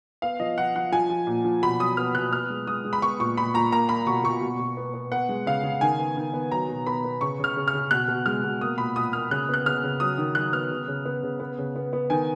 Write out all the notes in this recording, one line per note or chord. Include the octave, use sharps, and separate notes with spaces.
B3 F5
F3 D#5
F3 F#5
F3 F#5
F3 G#5
F3
A#2
F3
B2 B5
F#3 D#6
B3 F6
B2 F#6
B3 F6
G#3
G#3 D#6
G#3
B5
B3 C#6
A#2 C#6
A#2 B5
A#2 A#5
A#3 A#5
A#3 B5
B2 C#6
B2 C#6
B2
B2
B3
B3
B3 F#5
G#3
C#3 F5
C#3
D#3 G#5
B3
D#3
B3
F#3 A#5
B2
B3 B5
B3
C#3 C#6
C#3 F6
C#3
F6
C#3
B2 F#6
B2
G#3 F6
B2
A#3 D#6
A#2 B5
A#2 D#6
A#3 F6
C#3 F#6
B3 F#6
C#3 F6
C#3
F#3 D#6
D#3
F#3 F#6
B3 F6
C#3
C#3
B3
C#3
B3
C#3
B3
B3
D#3 G#5